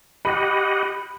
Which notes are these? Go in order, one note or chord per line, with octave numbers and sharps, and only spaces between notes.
G4 D#5 F#5 B5